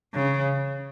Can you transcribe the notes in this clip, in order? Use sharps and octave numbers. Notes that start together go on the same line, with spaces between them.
C#3